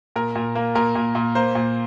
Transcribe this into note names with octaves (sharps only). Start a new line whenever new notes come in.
A#2 A#4
A#2
A#3
A#2 A#4
A#2
A#2
A#3 C5
A#2